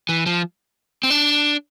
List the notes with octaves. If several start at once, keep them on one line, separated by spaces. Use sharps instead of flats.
E3
F3
C4
D4